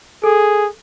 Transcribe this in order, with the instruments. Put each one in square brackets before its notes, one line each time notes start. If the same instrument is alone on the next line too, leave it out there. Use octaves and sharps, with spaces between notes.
[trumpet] G#4 [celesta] A4